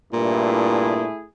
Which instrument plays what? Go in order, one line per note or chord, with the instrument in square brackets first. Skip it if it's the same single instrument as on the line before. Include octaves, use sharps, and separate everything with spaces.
[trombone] G2 [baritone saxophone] A#2 [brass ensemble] A3 E4 G#4